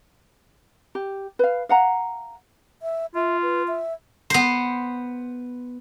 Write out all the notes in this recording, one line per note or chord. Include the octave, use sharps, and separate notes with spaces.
G4
B4 F5
F5 F#5 A#5
E5
F4 E5
B4
E5
B3 C5